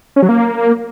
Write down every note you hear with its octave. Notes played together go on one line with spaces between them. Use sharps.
C#4
F#3
A#3